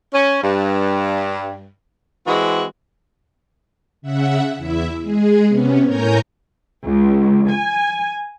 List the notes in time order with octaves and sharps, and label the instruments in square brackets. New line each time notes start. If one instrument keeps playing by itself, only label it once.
[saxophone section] C#4
G2
E3 G#3 C4 F#4
[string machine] C#3 E5 F#5
E2 E4 E5
G#3 G#4
C3 B3 C#4
A2 A#4 C#5 G#5 A#5 G6
[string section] C#2
G#5